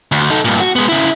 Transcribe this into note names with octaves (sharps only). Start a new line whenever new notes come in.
D2
D#4 A4
G2 A#2
F#4
G#3 B3
C#3 E4